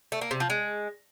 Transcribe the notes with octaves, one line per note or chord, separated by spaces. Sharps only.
A3
A#3
C3
F3
G#3